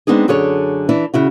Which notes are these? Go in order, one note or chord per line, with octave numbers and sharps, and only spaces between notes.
G#3 B3 C4 D4 D#4 G#4
F#2 D3 G#4 A4 C#5
E3 D4 E4
C#3 E4 F#4